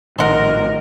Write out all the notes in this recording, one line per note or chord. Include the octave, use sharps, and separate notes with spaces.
A#1 A2 D#3 A#4 D#5 F#5 C6